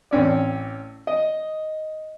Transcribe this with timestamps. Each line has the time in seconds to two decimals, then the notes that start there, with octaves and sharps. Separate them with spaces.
0.11 A1 C4 C#4 D5
1.07 D#5